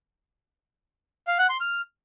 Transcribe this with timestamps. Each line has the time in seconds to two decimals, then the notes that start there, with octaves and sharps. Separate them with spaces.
1.27 F5
1.38 F#5
1.49 C6
1.60 F6